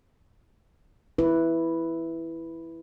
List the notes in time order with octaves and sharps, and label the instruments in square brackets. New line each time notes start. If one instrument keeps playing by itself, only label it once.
[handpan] E4 B4